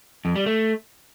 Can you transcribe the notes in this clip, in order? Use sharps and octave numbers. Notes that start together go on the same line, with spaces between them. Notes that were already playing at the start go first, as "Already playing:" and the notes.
F2
G3
A3